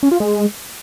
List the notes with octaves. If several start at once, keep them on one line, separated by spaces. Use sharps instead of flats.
C#4
F4
G#3